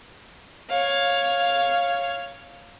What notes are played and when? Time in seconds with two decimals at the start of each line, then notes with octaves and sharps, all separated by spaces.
0.70 C#5 F5